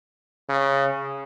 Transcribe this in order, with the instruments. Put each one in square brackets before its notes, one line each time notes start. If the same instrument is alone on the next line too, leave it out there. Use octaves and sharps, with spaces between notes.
[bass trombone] C#3